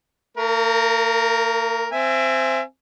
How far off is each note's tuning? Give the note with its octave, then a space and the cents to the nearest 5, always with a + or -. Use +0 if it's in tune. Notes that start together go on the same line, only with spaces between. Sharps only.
A#3 -45 A#4 +0
C4 -5 E5 +25 G#5 +0